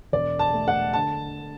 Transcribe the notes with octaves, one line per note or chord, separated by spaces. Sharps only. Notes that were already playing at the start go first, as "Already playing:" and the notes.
E1 D5
A5
A3
F#5
D3 A5